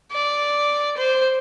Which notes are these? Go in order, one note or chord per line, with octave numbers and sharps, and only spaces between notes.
D5
C5